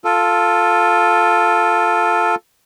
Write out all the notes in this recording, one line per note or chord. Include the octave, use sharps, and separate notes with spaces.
F4 A4